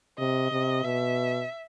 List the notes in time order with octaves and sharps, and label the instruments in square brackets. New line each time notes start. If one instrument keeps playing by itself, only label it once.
[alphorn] C3 [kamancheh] D#5
[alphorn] C3
[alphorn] B2 [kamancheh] E5